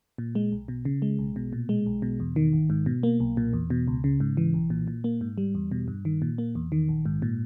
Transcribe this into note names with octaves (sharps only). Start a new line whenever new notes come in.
A#2
G#3
B1
B2
C#3
G#3
B1
B2
A#2
G#3
B1
B2
E2
D#3
G#1
G#2
B2
A#3
B1
A#2
E2
B2
C#2
C#3
G#2
E3
B1
A#2
A#2
A#3
G#2
G3
E2
B2
G2
D#3
A#2
A#3
E2
D#3
A#1
G#2
A#2